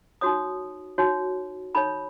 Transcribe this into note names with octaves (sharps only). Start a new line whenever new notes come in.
D#4 F#4 C#5 D#6
D#4 F#4 C#5
D#4 A4 C#5 B5